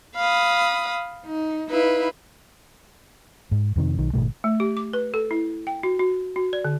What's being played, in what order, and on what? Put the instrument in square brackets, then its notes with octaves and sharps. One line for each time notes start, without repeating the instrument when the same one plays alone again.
[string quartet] F5 B5 D#6
D#4
D#4 E4 B4 F5
[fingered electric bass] G#2
F2 C3 D#3
B1 D#3
G#1 F2 B2 A3
[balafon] A3
G4
D6
B4
A4
E4
G5
F#4
F#4
F#4
D5
D3